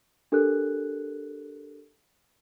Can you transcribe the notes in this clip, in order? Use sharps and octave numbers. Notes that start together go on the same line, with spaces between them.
D4 G4 A4 A#4 F#6